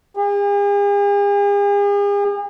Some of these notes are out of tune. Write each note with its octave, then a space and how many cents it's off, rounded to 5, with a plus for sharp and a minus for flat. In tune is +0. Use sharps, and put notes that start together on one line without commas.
G#4 -45